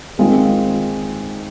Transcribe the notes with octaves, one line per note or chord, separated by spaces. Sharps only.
D#3 G#3 C4 F4